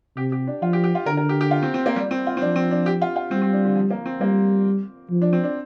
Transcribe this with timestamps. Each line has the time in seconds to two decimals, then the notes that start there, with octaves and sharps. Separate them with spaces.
0.17 C3 G4
0.32 G4
0.47 D4
0.62 F3 F4
0.73 G4
0.84 G4
0.95 F4
1.06 D3 A#4
1.17 A#4
1.29 G4
1.41 G4
1.51 F4
1.63 C4
1.74 C4
1.86 A#3
1.96 G3
2.11 C4
2.27 F4
2.37 C4
2.41 F3 D4
2.56 C4
2.71 D4
2.86 G4
3.02 F4
3.16 F4
3.31 G3 C4
3.42 C4
3.53 D4
3.65 D3
3.76 F3
3.90 A#3
4.06 C4
4.21 G3 A#3
5.10 F3
5.22 D4
5.33 C4
5.44 D4